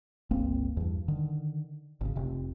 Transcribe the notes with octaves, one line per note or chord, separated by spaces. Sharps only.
G1 C#2 A#3 C4
E2 G2
D3 D#3
G#1 C#3
F1 C3